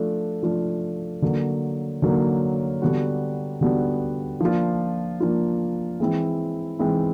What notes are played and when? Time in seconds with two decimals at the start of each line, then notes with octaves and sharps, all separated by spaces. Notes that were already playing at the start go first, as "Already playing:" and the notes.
Already playing: F3 A3 D4 F4
0.43 F3 A3 D4 F4
1.22 D3 F#3 A#3
2.02 D3 F#3 A#3
2.82 D3 G3 B3 D4 F#4
3.61 D3 G3 B3 D4 F#4
4.40 F3 A#3 D4 F4
5.20 F3 A#3 D4 F4
6.00 E3 G#3 C4 E4
6.79 E3 G#3 C4 E4